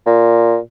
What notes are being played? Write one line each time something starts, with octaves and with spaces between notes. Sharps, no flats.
A#2